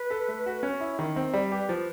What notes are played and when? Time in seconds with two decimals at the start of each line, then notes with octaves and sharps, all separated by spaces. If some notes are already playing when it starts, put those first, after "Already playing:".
Already playing: B4
0.10 A4
0.28 A3
0.46 F#4
0.63 C#4
0.80 E4
0.99 D#3
1.16 C4
1.33 G3
1.51 G4 B4
1.69 F3